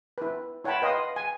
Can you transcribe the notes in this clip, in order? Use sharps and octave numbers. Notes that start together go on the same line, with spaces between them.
E4 B4
E4 C#5 F#5 G5 A5 B5
B4 D#5 F5 C6 D#6
G#5